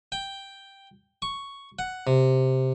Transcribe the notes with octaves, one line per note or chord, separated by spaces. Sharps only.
G5
C#6
F#5
C3